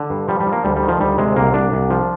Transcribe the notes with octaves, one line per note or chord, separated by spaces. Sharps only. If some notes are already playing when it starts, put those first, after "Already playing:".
Already playing: D3
G2
F3 G3
G3
F3
A#3
D2 G3
G3
D#3
F3
D2 G3
C3 G#3
C2 A#3
C2 D4
C2
F3